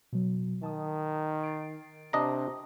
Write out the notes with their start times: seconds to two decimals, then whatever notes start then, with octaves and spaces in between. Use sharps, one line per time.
0.13 B2 F#3
0.63 D#3 A5 D#6
1.43 A6 C7 D7
2.13 C3 D4 D#5 A#5